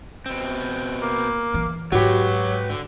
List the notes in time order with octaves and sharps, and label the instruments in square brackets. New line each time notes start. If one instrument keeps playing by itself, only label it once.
[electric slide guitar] B2 C4
[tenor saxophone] A#3
[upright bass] E3
[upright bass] G#2 [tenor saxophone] F#3 [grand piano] F#4 G4 [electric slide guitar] B4 C#5
[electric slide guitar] D3